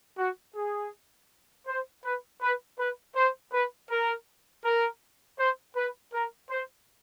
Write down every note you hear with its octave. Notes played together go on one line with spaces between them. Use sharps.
F#4
G#4
C5
B4
B4
B4
C5
B4
A#4
A#4
C5
B4
A#4
C5